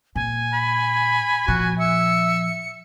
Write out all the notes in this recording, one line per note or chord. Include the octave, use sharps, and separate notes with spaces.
A#2 G#5
B5
A#2 F3 F#4
E5 C#7